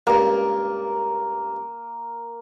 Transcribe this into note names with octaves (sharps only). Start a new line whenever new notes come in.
C#2 G2 A#3